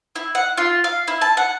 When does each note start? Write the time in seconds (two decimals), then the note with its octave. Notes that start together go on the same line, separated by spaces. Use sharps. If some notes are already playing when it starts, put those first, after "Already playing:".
0.16 E4
0.35 F#5
0.58 F4
0.84 F5
1.08 E4
1.21 A5
1.37 F#5